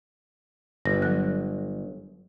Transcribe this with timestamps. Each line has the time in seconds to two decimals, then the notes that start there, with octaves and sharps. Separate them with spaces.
0.85 G1 A#6
1.02 F#3 F#6